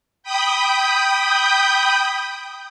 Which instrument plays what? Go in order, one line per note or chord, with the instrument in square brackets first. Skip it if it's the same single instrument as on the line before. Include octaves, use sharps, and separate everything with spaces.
[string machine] G5 B5 D#6 G6